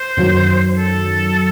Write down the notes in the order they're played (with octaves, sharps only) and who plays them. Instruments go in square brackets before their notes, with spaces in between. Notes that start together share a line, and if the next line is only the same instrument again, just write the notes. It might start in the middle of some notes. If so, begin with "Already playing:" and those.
Already playing: [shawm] C5
[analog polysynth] F#2 D#3 F#3
[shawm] A4